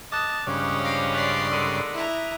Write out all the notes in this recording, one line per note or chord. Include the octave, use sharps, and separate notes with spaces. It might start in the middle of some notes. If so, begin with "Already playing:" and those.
D#5 A5 D6 D#6 F#6
G2 C#3 F3 G#3 C#4 D4
F5 D6 A#6 D7
D5 C6 F#6 B6 F7
D3 D#3 G#3 E6 B6 D#7
E4 A#5